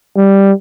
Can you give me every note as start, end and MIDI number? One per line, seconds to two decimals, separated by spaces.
0.16 0.52 55